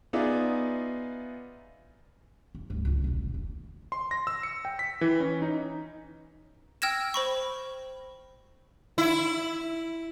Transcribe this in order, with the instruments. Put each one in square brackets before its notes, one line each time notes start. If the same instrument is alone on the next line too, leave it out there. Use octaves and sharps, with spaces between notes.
[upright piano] B3 D#4 F4 G#4 D5 E5
[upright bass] E2
D2 G2
C#2 D3
E1 A1
E2
[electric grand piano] C6
A#6
E6
C#7
G5
B6
E3
C#4
D#4
[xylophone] G5 E6 F6 G#6 A#6 E7
C5 B5 C#6
[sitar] E4